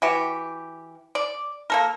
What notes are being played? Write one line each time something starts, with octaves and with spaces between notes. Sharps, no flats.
E3 F#4 G4
D5
A#3 A4 A#4